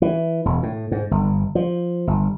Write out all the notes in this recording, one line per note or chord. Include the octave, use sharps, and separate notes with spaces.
E3
E1
A2
G#2
G1
F3
G1